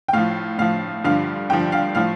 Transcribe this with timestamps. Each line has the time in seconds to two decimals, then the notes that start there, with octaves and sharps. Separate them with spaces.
0.08 G5
0.13 A2 F3 F5
0.58 A2 F3 F5
1.04 G2 D3 F3 F5
1.50 G2 D3 F3 G5
1.72 F5
1.95 A2 F3 F5